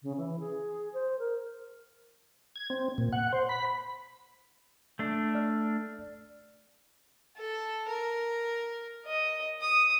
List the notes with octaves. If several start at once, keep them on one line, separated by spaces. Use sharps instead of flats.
C#3
E3
G#4
C5
A#4
G#6
C4
A#2
F#5
C5
B5
A3 D4
D5 F6
A4
A#4
D#5
D#6